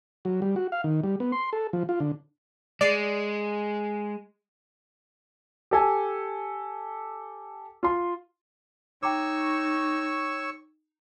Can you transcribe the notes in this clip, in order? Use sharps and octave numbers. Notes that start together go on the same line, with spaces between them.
F#3
G3
F#4
F5
D#3
G3
B3
C6
A4
F3
F4
D3
G#3 D5 C7
G4 A4 G#5
F4 C6
D#4 C#5 G5 A#5 C#6 D6 E6